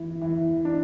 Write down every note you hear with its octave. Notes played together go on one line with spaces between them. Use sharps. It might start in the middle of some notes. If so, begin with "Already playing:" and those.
Already playing: E3
E3
D4